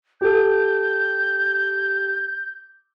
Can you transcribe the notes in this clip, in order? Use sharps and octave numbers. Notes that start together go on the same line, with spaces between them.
G4 A4 G6